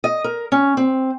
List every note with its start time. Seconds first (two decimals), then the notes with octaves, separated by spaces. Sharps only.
0.04 D#5
0.24 A#4
0.52 C#4
0.77 C4